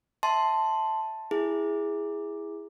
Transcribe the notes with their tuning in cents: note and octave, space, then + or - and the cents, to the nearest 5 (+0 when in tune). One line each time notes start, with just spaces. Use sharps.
E5 -15 A5 +0 C6 +0
E4 +0 G#4 -10